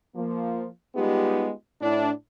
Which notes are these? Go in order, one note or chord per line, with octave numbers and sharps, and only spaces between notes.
F3 A#3
G3 G#3 B3 D#4 F4 G4
A2 D4 E4